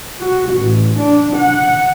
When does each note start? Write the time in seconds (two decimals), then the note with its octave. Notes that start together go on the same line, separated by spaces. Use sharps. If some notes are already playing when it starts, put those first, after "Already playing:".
0.20 F#4
0.54 A1
0.99 D4
1.37 F#5